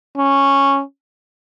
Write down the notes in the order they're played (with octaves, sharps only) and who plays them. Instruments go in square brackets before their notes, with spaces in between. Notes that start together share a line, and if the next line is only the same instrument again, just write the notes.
[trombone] C#4